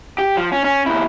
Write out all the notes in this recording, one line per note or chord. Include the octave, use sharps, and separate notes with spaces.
G4
F3
C#4
C#4
D#2 E4